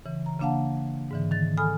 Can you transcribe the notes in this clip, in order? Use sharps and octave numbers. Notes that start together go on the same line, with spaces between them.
C#3 E3
A#5
C#3 A#3 D4 F5 F#5 A5
G#2 D3 E3
D#3 A6
A4 G#5 B5 D#6 F6